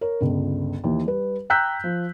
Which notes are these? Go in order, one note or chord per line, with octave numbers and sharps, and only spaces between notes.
A#4 C#5
G1 C#2
D#2 E3
G3 B4
G5 A#5 E6 F#6 G6 B6
F3